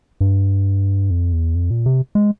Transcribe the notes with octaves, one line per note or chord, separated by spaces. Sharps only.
G2
F2
E2
F2
A#2
C3
G#3